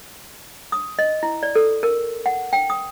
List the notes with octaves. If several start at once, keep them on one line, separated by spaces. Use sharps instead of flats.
D#6
D#5
E4
D5
A4
A#4
F#5
G5
D#6